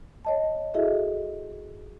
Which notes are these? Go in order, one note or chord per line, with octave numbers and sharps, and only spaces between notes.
C#5 D#5 A5
E4 F#4 G#4 A4 D#5 E5